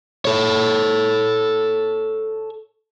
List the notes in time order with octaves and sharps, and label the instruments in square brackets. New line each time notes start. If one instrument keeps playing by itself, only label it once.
[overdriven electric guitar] A4 C#5